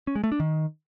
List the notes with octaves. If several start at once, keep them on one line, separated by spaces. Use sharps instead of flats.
C#4
G#3
A3
D4
D#3